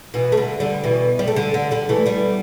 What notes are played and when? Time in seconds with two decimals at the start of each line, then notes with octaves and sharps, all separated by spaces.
0.14 B2 E3
0.32 A3
0.37 D3 G3
0.60 D3 G3
0.84 B2 E3
1.19 G3
1.28 A3
1.36 D3 G3
1.54 D3
1.71 D3 G3
1.89 E3 A3
2.06 G3 B3